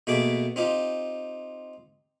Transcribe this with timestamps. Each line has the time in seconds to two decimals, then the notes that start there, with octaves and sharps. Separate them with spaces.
0.07 B2 A3 A#3 G#4 B4 D6
0.56 C4 D#4 F4 G4